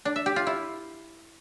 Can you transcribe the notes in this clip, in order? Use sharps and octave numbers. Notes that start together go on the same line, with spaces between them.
D4
E5
G4
F4
E4